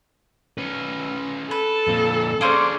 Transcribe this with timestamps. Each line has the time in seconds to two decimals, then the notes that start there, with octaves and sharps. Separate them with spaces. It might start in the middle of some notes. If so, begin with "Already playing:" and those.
0.58 C#4 B4
1.51 A4 B4
1.88 F2 A#2
2.41 A#3 C#4 D4 G#4 C5